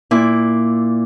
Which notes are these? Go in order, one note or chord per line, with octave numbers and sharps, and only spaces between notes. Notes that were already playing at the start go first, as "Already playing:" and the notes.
A#2 E4 D6